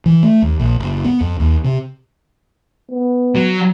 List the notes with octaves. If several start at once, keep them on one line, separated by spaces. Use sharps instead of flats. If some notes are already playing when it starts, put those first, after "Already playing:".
E3
A3
D#2
A#1
F#1
B3
F2
D#2
C3
B3
F#3